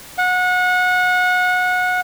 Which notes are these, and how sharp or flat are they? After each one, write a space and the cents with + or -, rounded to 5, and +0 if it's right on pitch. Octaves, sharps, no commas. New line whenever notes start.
F#5 -25